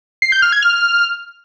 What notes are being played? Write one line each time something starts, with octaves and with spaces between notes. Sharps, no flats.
C7
G6
F6
G#6
F6